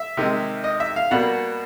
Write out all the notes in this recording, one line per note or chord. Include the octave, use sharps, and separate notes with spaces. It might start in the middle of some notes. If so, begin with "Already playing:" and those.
Already playing: E5
C3 D#3 G#3
D#5
E5
F5
B2 G3 A#3 F#5